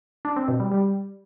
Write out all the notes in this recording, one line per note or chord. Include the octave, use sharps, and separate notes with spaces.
D4
C4
B2
G3
G3